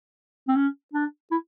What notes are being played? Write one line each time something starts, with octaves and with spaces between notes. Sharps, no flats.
C4
C#4
D4
E4